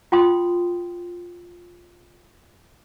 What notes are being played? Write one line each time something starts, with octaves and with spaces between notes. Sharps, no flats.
F4 G5 C6 D#6